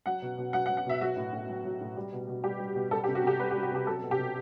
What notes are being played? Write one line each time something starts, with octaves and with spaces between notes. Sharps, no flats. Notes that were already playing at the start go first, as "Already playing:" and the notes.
F#3 F#5
B2
B2
F#3 F#5
F#5
F#3
F#5
B2 E5
F#3 F#4
A2
A2
F#3
F#3
A2
G3
B2
B2
G3 G4
G3
B2
G3 A4
G4
C3
F#4
C3 G4
G3 B4
G4
G3
F#4
C3 G4
F#3 A4
B2
G4
B2